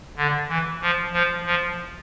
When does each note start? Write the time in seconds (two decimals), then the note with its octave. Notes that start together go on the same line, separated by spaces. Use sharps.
0.17 D3
0.48 E3
0.81 F3
1.13 F3
1.45 F3